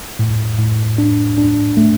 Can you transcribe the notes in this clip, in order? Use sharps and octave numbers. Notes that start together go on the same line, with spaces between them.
A2
A2
D4
D4
A3